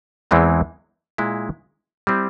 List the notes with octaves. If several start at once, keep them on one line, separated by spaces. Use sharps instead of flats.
E2 E3 G#3 C4 E4
A#2 G#3 E4
G3 C4 E4